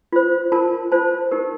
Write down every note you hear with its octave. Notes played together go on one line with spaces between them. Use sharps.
F4 C5
F4 A#4 A5
F4 C5 A5
D#4 G4 A#4